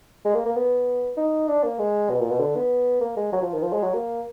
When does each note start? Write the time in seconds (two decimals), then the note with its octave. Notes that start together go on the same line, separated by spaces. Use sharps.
0.25 G#3
0.34 A#3
0.45 A#3
0.56 B3
1.17 D#4
1.48 D4
1.63 A#3
1.79 G#3
2.10 B2
2.20 A#2
2.30 B2
2.40 D3
2.56 B3
3.01 A#3
3.17 G#3
3.32 F#3
3.42 F3
3.53 D#3
3.62 F3
3.73 G#3
3.83 F#3
3.94 A#3